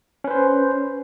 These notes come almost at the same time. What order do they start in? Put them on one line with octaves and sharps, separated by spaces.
C#4 B4 C5